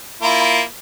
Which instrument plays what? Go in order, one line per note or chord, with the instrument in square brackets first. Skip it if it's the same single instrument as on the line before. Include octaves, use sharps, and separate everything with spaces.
[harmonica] A#3 E4 F4